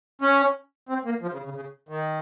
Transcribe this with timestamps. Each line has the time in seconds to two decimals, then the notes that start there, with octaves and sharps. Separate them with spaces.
0.22 C#4
0.89 C4
1.05 A#3
1.22 F3
1.33 C#3
1.45 C#3
1.56 C#3
1.89 D#3